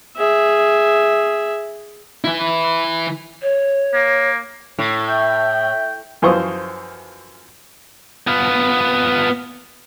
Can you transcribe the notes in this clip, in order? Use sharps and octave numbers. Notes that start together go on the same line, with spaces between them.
G#4 E5
E3 E4
C#5
A#3
A2
E5 G5
F#2 E3 F3 C5 C#6 D#6
B3 F4